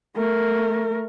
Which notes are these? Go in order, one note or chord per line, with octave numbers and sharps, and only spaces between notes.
A3 A#4